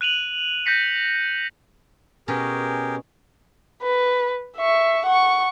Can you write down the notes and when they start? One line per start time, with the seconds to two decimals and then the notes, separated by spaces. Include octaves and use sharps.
0.01 F#6 D#7 F7 F#7
0.66 G6 A#6 B6 C#7
2.28 B2 C#4 G4 G#4 A#4
3.83 B4
4.57 E5 C#6
5.05 F#5 C#6